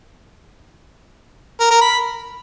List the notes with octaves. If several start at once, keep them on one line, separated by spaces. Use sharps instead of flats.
A#4
A#4
B5